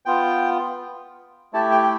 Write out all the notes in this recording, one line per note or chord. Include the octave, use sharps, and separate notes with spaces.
B3 F4 G5
A3 E4 G4 A5
G5
G5